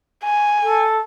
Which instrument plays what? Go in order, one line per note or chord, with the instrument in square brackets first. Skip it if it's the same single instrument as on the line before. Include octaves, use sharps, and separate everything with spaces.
[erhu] G#5
[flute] A4